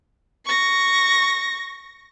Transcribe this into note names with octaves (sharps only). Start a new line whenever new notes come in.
C#6 A#6